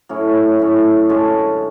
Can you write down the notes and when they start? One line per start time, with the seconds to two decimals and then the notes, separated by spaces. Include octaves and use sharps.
0.09 A2 F#3 C#4 E4
0.59 A2 F#3 C#4 E4
1.09 F#2 D3 G#3 C#4